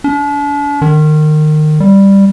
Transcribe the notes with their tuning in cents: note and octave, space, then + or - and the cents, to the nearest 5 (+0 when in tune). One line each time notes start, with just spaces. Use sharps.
D4 -40
D#3 -25
G3 +5